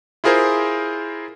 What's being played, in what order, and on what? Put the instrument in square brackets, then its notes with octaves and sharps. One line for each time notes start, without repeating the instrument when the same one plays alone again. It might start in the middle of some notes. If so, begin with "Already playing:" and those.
[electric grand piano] E4 F4 G#4 A#4 C5